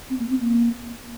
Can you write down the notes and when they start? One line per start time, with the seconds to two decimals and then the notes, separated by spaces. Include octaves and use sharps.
0.10 C4
0.19 A#3
0.30 C4
0.40 A#3